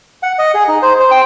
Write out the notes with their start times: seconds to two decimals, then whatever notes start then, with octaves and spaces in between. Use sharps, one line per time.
0.23 F#5
0.39 D#5
0.54 G#4
0.68 D#4
0.82 C5
1.00 C5
1.11 G5